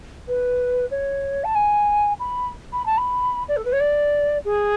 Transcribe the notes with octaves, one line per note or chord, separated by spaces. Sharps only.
B4
C#5
A5
G#5
B5
B5
A5
B5
D5
A4
B4
C#5
D5
G#4